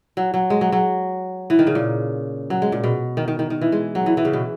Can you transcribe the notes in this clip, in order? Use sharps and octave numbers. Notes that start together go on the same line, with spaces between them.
F#3
F#3
G#3
F#3
F#3
E3
D#3
C#3
A#2
F#3
G#3
A#2
B2
D#3
D#3
D#3
D#3
E3
G#3
F#3
E3
E3
C#3
B2